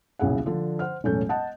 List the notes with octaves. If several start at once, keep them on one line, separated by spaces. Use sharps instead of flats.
D#1 B1 C#3 E4 G#4 F#5
D3 F3 D4
C5 F#5 F6
E1 A2 F#3 C#4 A4 G6
D#5 F#5 A5